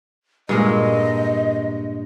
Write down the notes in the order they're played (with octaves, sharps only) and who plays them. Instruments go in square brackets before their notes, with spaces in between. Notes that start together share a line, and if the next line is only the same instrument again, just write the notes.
[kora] G2 A#2 G#3 [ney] D#5